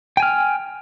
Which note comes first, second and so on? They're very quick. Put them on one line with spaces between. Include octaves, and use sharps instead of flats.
G5 G#5 F6